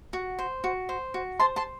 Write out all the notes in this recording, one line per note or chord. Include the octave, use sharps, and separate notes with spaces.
F#4
C5
F#4
C5
F#4
C5 A5 C6
A5 C6